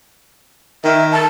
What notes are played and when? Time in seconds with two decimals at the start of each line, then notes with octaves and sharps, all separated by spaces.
0.85 D#3 E5
1.12 A5